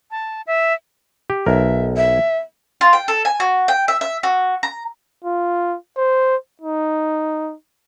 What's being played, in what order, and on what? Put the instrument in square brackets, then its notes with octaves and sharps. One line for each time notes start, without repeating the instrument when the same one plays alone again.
[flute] A5
E5
[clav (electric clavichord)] G4
[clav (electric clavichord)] B1 A#4 [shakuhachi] E5
[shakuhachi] E5
[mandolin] F4
G5
A4
G#5
F#4
G5
E5
E5
F#4
A#5
[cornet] F4
C5
D#4